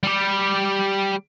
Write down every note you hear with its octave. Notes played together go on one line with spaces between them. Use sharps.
G3 G4